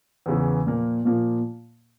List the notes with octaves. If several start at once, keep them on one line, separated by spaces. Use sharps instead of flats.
E2 C#3 E3
A#2 F3 A#3
A#2 F3 A#3